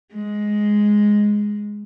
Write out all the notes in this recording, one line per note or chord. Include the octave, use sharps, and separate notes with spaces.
G#3